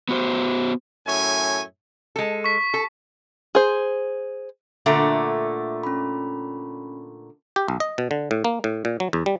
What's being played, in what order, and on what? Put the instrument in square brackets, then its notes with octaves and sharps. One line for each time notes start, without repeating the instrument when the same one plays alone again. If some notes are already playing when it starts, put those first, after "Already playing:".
[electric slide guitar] B3 F#4 C5
[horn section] F#2 A2 C#5 E5 G#5
[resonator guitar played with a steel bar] G#3 A4
[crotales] C#6 B6
[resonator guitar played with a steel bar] A4
[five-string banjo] G#4 C5
[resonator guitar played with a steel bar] A#2 D3 A3 [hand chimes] E5 F#5
[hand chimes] C#4 B5
[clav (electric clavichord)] G4
B1
D#5
B2
D3
A2
A#3
A2
A#2
F#3
E2
G3